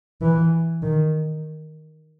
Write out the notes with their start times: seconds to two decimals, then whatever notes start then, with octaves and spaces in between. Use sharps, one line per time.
0.22 E3
0.83 D#3